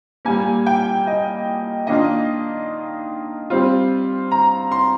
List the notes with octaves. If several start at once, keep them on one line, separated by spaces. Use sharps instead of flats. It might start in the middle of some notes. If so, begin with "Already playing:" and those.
A#2 G3 A#3 G#5
G5
D#5
D#3 A#3 D4 F4 D#5
G3 C4 F4
A#5
C6